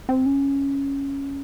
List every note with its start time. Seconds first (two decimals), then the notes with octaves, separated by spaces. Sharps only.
0.09 C4
0.26 C#4